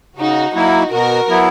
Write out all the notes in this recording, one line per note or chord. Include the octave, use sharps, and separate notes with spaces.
C#3 D#4 F#4
F#3 A#3 D#4 E4 F#4
B2 F#4 A#4
F#3 B3 E4